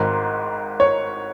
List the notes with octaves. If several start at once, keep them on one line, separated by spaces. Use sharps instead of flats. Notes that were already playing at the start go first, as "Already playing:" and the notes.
Already playing: G#1 G#2 D#3 A#4
C#5